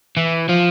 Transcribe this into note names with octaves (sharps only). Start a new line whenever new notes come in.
E3
F3